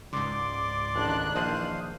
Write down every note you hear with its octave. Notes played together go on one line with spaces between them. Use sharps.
C#2 G#2 D5 C6 D6
A1 D#3 D4 F#6
A#1 E3 C5 F5 D#6